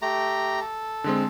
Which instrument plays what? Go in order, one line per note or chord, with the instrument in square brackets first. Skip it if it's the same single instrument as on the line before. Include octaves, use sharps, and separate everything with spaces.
[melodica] A3 G4 A#5
A4
[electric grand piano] D3 G#3 C4